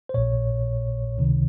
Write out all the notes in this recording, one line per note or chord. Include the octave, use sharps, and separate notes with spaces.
C5
A#1 A#2 C#5
C#2 C3 D#3